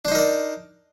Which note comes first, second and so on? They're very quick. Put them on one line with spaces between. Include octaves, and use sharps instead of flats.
D4 C5 D#4 A#4 D5